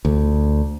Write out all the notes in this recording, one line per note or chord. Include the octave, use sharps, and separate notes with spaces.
D2